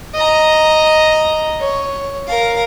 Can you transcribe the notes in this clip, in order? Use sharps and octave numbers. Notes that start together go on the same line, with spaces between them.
D#5 A#5
C#5
A#4 F5